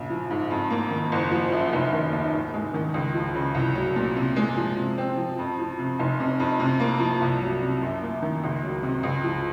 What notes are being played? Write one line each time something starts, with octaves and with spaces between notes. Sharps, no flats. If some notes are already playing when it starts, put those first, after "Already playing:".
Already playing: A#1 C#3
F3
G#2
F2
A#3
D#3
F#1
F3
F#2
F1
D#3
D#2
G#2
G#3
D#3
C#2
F3
C#3
C2
F#3
A#2
C3
G#3
F3
C3
C4
F3
F2
F3
C3
F1
C3
F2
C3
A#3
F3
C2
F#3
C3
F#2
A#3
D#3
C#2
F#3
C3
C#2
F3